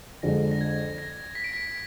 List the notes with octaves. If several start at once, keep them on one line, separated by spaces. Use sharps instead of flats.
F2 D3 G#3 A#6
A#6
G#6
A#6
B6
D7
B6